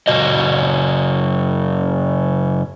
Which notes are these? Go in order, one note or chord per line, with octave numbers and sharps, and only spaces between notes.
F#2 C#3 F#4 D#5